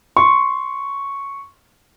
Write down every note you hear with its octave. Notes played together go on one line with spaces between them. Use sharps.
C6 C#6